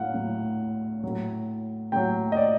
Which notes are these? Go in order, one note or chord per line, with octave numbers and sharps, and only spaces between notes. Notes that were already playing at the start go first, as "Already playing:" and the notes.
Already playing: A2 F#3 F5 F#5
A2 F#3
A2 F#3
A2 F#3 G5
D#5
D5